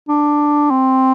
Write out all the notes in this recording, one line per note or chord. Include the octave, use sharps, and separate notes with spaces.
D4
C4